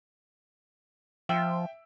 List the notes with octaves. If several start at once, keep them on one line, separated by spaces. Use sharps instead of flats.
F3 E5 G5 E6